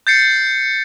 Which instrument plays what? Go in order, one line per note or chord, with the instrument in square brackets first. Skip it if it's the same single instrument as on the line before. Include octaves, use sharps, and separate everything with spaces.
[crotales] G6 A6 C7 C#7